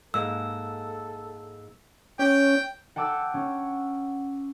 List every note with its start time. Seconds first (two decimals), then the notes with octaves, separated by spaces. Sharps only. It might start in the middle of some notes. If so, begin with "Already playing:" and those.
0.14 G#2 G#3 A#3 A4 E6
2.19 C#4 G5
2.96 F#5 G5 A5 D6 E6
3.34 C#4